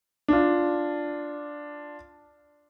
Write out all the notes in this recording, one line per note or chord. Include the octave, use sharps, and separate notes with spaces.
D4 F4